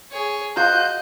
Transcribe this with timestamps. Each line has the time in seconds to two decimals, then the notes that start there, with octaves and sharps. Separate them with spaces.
0.11 G#4 C#5
0.57 F4 F#4 C5 D#5 G6